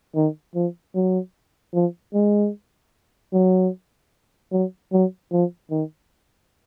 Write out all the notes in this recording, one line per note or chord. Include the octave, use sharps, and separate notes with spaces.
D#3
F3
F#3
F3
G#3
F#3
F#3
F#3
F3
D#3